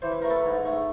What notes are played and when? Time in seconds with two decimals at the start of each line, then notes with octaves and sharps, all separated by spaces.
0.02 E3 C5
0.12 B4
0.22 A3 A#4
0.30 A4 B4
0.45 G#2
0.65 A3